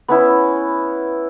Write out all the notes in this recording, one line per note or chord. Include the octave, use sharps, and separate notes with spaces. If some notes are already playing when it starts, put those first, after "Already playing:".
B3 C#4 E4